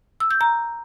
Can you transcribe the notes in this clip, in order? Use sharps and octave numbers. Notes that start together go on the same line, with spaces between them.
E6
G6
A#5